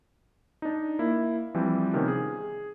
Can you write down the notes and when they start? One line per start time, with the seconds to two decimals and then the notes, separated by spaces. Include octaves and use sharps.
0.62 D4 D#4
0.99 A#3 E4
1.55 E3 F3 G3 C4
1.93 C3 D#3 F3 B3 C#4
2.08 G#4